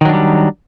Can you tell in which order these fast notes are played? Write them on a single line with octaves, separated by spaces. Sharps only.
D#3 F#3 D4 G3